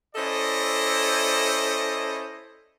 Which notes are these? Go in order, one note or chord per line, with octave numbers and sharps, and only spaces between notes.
C#4 E4 A4 C5 D5 D#5